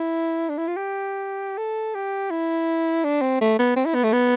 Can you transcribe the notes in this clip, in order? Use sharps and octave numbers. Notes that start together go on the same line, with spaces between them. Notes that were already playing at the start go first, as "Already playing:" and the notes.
Already playing: E4
D4
E4
F4
G4
A4
G4
E4
D4
C4
A3
B3
C4
E4
B3
A3
B3